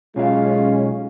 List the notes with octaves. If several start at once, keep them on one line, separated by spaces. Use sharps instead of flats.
B1 G#3 C#4 F4 F5